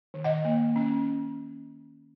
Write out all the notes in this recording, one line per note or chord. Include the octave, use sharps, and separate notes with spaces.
D#3
D#5 F#5
A#3
C#4